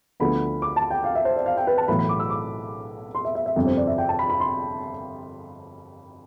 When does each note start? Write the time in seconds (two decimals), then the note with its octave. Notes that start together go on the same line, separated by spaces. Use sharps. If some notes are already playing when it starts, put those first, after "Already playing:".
0.20 D2 D3 F3 B3 B5
0.62 D6
0.76 A5
0.90 G5
1.04 F5
1.15 E5
1.25 C5
1.36 D5
1.46 F5
1.57 G5
1.67 B4
1.78 A5
1.88 B1 A2 E3 B5
1.99 B5
2.09 D6
2.19 E6
2.30 D6
3.15 C6
3.25 E5
3.35 E5
3.46 E5
3.56 G1 F2 C3
3.67 C5
3.77 D5
3.87 E5
3.98 G5
4.09 A5
4.19 B5
4.30 B5
4.40 C6